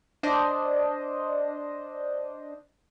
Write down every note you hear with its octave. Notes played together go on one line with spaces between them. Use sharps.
D4 C5 D#5